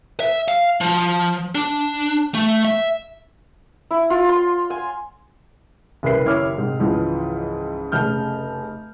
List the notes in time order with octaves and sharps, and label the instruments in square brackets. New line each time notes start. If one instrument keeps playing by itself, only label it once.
[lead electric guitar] E5
F5
F3
D4
A3
E5
[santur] E4
F4
C6
G#5
[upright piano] F#1 C2 A#4 B4 C7
F#1 D#2 E4 C#5 D6 F6
G#2 C3
C#2 G#2 E3 F3
F1 C#3 F6 G6